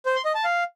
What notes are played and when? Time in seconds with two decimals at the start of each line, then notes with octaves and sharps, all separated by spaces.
0.06 C5
0.15 C6
0.25 D#5
0.35 A5
0.44 F5